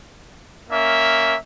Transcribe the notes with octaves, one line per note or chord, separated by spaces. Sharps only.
A#3 C#4 E5